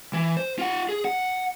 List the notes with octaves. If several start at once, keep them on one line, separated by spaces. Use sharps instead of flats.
E3
C5
F4 F#5
G#4
F#5